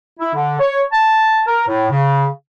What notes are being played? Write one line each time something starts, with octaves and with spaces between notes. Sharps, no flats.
E4
D3
C#5
A5
A#4
A2
C#3